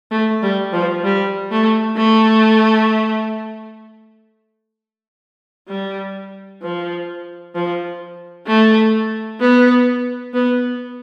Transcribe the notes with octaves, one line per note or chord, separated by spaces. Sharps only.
A3
G3
F3
G3
A3
A3
G3
F3
F3
A3
B3
B3